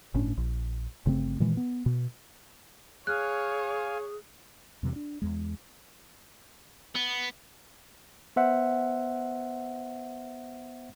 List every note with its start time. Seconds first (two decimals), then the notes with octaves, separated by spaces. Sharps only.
0.14 G1 A2 C#4 D4
0.37 A#1
1.06 G1 C#3 A3 C4
1.40 A#2 D#3 E3 G#3
1.57 B3
1.86 B2
3.07 G#4 C#5 F5 G#5 F6 F#6
4.83 E2 G2 C3 E3
4.96 D4
5.22 E2 G#3
6.95 B3
8.36 B3 C5 E5 F#5